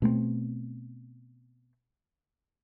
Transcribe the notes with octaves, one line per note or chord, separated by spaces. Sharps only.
B2 A3 A#3 C4